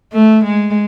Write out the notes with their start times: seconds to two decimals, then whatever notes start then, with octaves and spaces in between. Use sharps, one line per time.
0.13 A3
0.45 G#3